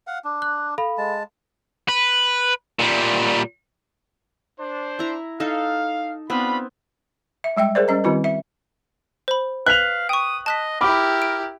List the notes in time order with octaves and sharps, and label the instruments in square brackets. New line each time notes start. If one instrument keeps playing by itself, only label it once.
[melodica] F5 F#5
D4
[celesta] F#6
A4 F5 B5
[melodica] G#3 A5
[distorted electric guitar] B4
A#2 G3
[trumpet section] D4 C5
[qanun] E4 A#5
[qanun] D#4 A4 [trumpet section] F5
[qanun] B3 C4 [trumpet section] D4 F4 B5
[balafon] E5
G3 G#3 E5 G5
G#4 A#4 C5 D5
G3 C#4 D#5 A#5
D#3 G3 C4 E4 F#4 B4
E5
[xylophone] C5 B5
[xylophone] B4 [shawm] F5 [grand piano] F#6 B6 F7
[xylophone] G5 C#6 [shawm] D#6
[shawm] D#5 [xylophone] A5 F#6 B6
[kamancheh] E4 G4 [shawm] A#4 [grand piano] B5 D6
[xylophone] D7